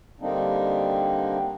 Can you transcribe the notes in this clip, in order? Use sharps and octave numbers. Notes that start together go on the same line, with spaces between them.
D3 G3 A#3 C4 D4 D#4